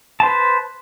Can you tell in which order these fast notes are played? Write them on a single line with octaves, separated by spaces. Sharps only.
A5 C5 B4